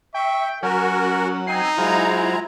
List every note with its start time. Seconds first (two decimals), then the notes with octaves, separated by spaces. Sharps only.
0.14 E5 G5 C#6
0.63 F#3 C#4 F#4 A#4 F#5
1.47 C4 D#4 G#5 C7
1.78 F#3 G#3 E4 F4 G#4 C5 A#5